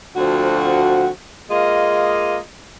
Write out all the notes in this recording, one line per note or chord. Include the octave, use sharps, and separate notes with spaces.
D2 F3 C4 F#4
G#3 A#3 F4 D#5